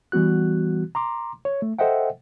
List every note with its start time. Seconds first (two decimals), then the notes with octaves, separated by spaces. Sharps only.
0.12 E3 G3 B3 F#4 F#6
0.95 A#5 C6 D6
1.45 C#5
1.62 A3
1.79 A4 C5 D#5 E5 F#5 G5